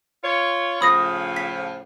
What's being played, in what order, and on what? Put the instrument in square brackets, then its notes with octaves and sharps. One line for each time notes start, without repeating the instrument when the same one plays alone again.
[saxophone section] F4 C#5
[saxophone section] A2 C#3 F3 [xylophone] B5 D#6 A#6
[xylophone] B6